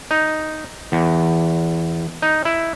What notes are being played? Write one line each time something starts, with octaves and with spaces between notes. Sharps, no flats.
D#4
E2
D#4
E4